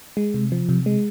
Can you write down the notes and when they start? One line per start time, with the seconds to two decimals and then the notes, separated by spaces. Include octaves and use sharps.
0.17 G#3
0.34 C3
0.52 F3
0.69 C3
0.86 G#3